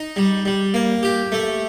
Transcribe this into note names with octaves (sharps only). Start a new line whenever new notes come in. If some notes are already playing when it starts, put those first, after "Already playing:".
Already playing: D#4
G3
G3
A#3
G4
A3